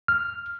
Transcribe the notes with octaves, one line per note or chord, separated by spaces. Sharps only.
F6